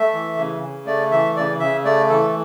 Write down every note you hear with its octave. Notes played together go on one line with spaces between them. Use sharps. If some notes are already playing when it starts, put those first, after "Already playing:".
Already playing: A3 E5
E3
C#3
C#3
A3 D5
E3 E5
C#3 D5
C#3 E5
A3 D5
E3 A4